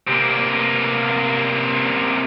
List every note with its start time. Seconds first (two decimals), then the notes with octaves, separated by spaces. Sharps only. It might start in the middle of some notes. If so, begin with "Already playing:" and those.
0.08 C3 A#3